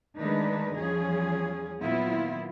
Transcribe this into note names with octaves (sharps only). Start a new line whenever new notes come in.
D#3 G#3 A3 D4 D#4 B4
E2 F3 G3 C#4 G#4
A#2 D#3 F#3 B3 E4 F4